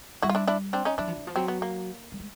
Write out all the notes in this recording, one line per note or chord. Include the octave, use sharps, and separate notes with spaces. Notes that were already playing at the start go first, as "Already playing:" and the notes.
G3 E4 F#4
F4
D4 E4
D4 E4
C4 D4
C#4 D#4
F#3 D4 E4
F3
E3
F3
F#3 C4
B3
A#3
G3
G#3